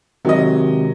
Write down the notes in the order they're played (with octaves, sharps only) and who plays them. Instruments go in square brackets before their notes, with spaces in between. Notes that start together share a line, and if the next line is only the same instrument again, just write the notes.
[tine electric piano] C3 D#3 G#3 [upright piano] F#3 D#5